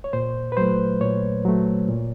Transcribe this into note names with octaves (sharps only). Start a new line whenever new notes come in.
C#5
A#2 C5
B4
F#3 A3 C5
A#2 C#5
F#3 A3
A#2